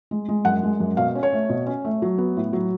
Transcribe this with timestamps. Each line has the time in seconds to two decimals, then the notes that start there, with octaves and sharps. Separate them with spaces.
0.11 G#3
0.29 G#3
0.45 F#2 F#5
0.63 G#3
0.80 F#2
0.97 B2 F5
1.15 C#4
1.23 C#5
1.33 A3
1.50 B2
1.67 C#4
1.85 A3
2.02 F#3
2.18 B3
2.37 A2
2.53 F#3